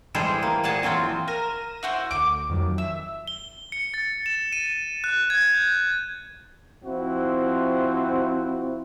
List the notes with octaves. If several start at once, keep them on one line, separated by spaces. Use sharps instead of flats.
E3 G3 G#3 G#4 A4 C5
A#3
A#2 G#4 F#5 A5
E3 F#3 C4 F4
A#4 A#6 D#7 E7
E4 F#4 C5
D2 D6
F2 D#3 F#3
E5 E6
G7
C#7
A6
E7
D#7
F#6
G#6
G6
F3 C4 E4 F#4